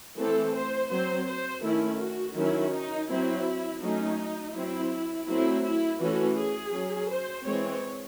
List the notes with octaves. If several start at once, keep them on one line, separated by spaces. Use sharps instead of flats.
E3 A3 C4 A4
C5
F#3 C4 C5
C5
D#3 A3 C#4 E4
F#4
D#3 F#3 C#4 E4
D#4
F#3 C4 E4
F#3 A3 C#4 D#4
F#3 C4 E4
F#3 A3 C4 E4
E4
E3 A3 C#4 F#4
G#4
F#3 C#4
C5
E3 G#3 C4 C#5